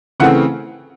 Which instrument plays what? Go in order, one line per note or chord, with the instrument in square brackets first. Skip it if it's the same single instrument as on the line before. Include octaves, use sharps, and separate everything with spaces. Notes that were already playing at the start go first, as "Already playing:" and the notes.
[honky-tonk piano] C#3 E3 A3 C4 F#5